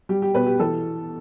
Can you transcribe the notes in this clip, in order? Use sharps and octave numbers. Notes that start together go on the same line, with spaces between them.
G3 G4
G4
B2 B4
G4
E3 A4